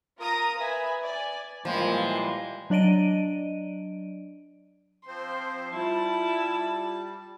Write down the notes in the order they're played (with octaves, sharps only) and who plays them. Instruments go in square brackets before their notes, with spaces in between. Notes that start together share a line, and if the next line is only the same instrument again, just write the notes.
[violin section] F4 A#4 A#5 D#6
B4 E5 G#5
D5 G#5
[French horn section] A#2 E3 [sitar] F3 [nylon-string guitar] G3 A#3 [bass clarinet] G#3
[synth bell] F#3 D4 D5 D#5 D7 D#7
[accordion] F3 C4 C5 [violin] C6
[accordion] G3 [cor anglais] E4 [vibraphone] F4 [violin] A5